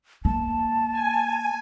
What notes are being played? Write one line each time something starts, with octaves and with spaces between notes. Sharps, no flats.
A#3 A5
G#5